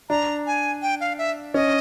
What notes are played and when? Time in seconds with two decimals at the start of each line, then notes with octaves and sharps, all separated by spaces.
0.10 D4 A#5
0.47 G#5
0.82 G5
1.01 F5
1.18 E5
1.54 C#4 D#5